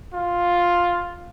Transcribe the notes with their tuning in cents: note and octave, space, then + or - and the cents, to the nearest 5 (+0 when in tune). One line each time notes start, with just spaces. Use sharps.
F4 +5